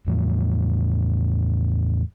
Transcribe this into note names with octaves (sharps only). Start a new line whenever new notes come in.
E2 A2 F3